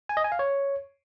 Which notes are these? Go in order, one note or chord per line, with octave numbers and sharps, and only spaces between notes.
G#5
D#5
G#5
F5
C#5